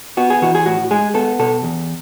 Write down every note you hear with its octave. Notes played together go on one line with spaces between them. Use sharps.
B3 F#4
G#4
E3 F#4
G#4
A2 F#4
G#3 G#4
B3 A4
B2 A4
E2